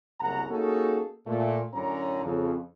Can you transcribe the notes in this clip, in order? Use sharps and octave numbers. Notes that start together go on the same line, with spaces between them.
F#1 C2 F#5 A#5
A#3 C#4 D#4 F#4 G#4 A4
A#2 A3
F#2 A2 D3 C#4 A#5
F2 C#3